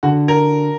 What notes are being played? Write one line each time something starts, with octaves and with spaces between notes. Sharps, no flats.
D3 F#4
A#4